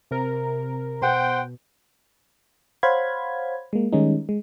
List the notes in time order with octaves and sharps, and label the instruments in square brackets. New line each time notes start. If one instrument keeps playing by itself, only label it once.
[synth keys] C3 A#4
[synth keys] B2 [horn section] C5 F#5 G5
[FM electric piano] C5 C#5 F5 F#5 B5 G#6
G#3 A#3
D#3 G3 G#3 C#4 D#4
G#3